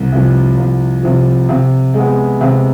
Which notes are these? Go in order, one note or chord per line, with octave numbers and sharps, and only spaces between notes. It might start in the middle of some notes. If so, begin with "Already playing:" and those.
Already playing: C2
C3 F3
C2
C3 F3
C3
G#3 B3
C3